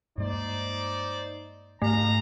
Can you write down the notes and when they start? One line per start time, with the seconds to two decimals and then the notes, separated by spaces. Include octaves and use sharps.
0.18 G2 G#3 A#3 D#4 C5 D5
1.82 G#1 G#2 A3 F5 A#5